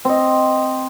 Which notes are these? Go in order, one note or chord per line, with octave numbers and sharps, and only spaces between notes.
C4 D#5